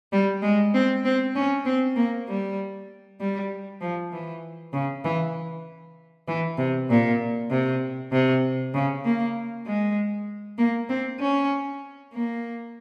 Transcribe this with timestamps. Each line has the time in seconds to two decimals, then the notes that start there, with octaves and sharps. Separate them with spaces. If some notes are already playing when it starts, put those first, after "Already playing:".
0.12 G3
0.42 G#3
0.74 C4
1.05 C4
1.36 C#4
1.65 C4
1.96 A#3
2.28 G3
3.20 G3
3.81 F3
4.13 E3
4.73 C#3
5.04 E3
6.28 E3
6.58 C3
6.90 A#2
7.50 C3
8.12 C3
8.74 C#3
9.05 A#3
9.66 G#3
10.58 A#3
10.89 C4
11.20 C#4
12.13 A#3